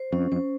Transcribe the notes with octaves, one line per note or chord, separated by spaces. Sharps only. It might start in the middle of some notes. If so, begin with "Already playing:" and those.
Already playing: C5
F2 C#4
F2 C5